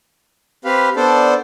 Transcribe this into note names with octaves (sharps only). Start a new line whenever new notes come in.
C4 G4 B4 F5 B5
B3 D4 A4 C5 D5